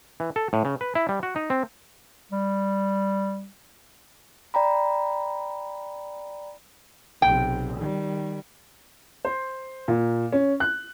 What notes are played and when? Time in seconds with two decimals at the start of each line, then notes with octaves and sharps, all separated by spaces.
0.20 E3
0.36 A4
0.53 A2
0.65 C#3
0.81 B4
0.95 E4
1.09 G3
1.23 F#4
1.36 D#4
1.50 C4
2.32 G3
4.54 D5 G5 A#5 B5
7.22 B1 C3 G5
7.76 D#3 G3
9.25 C5
9.88 A#2
10.32 C#4
10.60 F#6